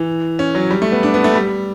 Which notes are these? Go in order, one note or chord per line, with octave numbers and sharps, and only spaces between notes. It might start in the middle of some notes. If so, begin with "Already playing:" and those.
Already playing: E3
C#4
F#3
G3
A3
B3
D4
B3
A3
G3